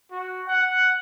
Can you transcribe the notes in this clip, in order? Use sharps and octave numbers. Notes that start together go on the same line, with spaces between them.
F#4
F#5